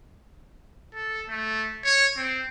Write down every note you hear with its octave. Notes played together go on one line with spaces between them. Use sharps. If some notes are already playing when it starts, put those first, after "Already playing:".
A4
A3
C#5
C4